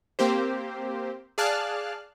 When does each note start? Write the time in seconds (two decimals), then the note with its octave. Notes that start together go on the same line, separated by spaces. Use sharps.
0.19 A#3 C4 G4 C5
1.38 G#4 D5 F5 A5 F6 F#6